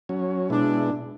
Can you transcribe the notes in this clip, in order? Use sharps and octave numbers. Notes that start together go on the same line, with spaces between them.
F#3 C#4
B2 G#3 D4 E4